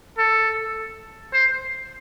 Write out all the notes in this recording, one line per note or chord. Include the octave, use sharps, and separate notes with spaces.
A4
C5